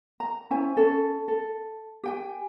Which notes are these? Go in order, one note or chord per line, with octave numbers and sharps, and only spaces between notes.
A#5
C#4 E4 C5 G#5
C#4 A4
A4
G4 G5 G#5